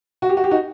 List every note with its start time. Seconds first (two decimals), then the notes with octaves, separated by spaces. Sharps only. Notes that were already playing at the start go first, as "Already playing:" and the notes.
0.22 F#4
0.29 G4
0.37 F#4
0.44 G4
0.51 D#4 F#4